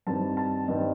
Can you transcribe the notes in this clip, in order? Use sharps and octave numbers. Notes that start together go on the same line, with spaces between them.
G2 D#3 G3 C4 A5
A5
G2 D#3 G3 C4 D#5